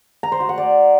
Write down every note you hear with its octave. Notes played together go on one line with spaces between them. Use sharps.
A#5
C5
F#4
F#5
D5